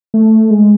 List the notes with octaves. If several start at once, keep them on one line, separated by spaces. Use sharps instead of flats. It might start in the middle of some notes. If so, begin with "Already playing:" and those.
A3
G#3